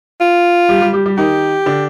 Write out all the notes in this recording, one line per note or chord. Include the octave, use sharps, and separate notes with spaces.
F4
G3 G4
G3 G4
G3 G4
G3 G4
D#3 D#4 G4
D3 D4